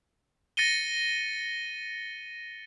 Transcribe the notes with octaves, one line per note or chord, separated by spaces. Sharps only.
A6 A#6 C#7 D#7 G7